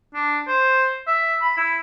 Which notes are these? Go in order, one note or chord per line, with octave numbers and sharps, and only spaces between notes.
D4
C5
E5
B5
E4